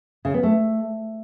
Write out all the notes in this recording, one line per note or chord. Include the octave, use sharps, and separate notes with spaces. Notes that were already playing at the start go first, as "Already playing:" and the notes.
C#3
B3
A3